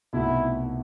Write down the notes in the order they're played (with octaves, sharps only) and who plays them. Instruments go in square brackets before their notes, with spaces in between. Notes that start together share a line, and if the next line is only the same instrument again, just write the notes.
[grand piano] C2 B2 A3 D#4 F#4 [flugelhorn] E4